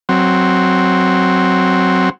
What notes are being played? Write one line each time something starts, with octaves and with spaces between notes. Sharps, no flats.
F#3 C4